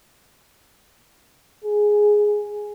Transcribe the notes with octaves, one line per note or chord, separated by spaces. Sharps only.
G#4